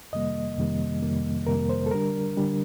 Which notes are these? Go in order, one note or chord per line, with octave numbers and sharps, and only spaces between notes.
F2 C3 D#3 G3 A#3 D#5
F2 C3 D#3 G3 A#3
F2 C3 D#3 G3 A#3
F2 C3 D#3 G3 A#3 A#4
C5
A4
D3 G3 D4 A#4
D3 G3 D4